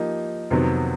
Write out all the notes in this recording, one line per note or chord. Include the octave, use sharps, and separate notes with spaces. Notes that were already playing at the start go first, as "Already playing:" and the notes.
Already playing: F3 A#3 D#4 G4
F2 C3 D#3 F#3 B3